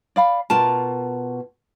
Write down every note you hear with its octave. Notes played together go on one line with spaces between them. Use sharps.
D5 F5 B5
B2 F4 A#4 A5